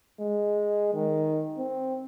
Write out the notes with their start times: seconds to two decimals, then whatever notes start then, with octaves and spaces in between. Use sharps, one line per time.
0.20 G#3
0.94 D#3
1.58 C4